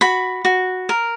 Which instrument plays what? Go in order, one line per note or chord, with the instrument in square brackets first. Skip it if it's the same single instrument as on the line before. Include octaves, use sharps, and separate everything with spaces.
[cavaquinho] F#4 B5
F#4
A#4